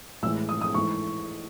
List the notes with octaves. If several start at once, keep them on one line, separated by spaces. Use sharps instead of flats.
A2 E3 G#3 E6
D#6
D#6
G#2 E3 A3 C#6